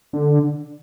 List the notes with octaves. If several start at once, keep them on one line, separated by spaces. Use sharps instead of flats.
D3